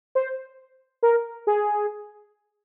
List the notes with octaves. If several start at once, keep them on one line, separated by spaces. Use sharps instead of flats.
C5
A#4
G#4